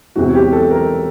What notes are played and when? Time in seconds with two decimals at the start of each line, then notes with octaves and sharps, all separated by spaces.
0.16 E1 E2 C3 F#4
0.35 G4
0.53 A4
0.71 A#4